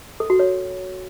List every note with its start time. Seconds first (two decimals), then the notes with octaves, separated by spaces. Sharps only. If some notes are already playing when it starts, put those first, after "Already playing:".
0.20 A4
0.30 F#4
0.39 C#5